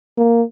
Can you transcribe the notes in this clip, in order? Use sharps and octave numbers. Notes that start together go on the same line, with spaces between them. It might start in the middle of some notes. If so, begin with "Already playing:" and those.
A#3